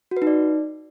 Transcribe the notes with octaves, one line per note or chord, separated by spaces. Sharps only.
F#4
B4
D#4
D5